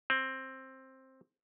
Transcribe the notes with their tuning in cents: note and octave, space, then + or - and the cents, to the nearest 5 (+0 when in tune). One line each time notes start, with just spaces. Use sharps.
C4 +10